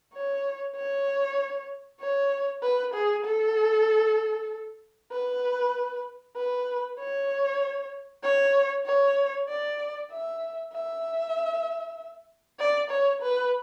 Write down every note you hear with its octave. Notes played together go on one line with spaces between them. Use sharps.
C#5
C#5
C#5
B4
G#4
A4
B4
B4
C#5
C#5
C#5
D5
E5
E5
D5
C#5
B4